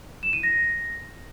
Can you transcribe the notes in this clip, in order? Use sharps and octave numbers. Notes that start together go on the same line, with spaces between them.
E7
D#7
A#6